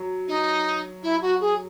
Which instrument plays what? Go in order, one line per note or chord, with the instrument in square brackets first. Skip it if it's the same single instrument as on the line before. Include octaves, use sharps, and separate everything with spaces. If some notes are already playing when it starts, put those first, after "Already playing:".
Already playing: [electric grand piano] F#3
[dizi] D#4
E4
F#4
G#4